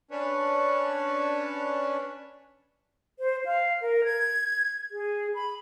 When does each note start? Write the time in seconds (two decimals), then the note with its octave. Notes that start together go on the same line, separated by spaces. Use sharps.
0.11 C#4 D4 B4 C#5
3.19 C5
3.45 F5
3.81 A#4
4.04 G#6
4.92 G#4
5.34 B5